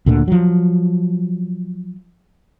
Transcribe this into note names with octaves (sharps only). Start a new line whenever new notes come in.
D2 A#2 D3
F3 F#3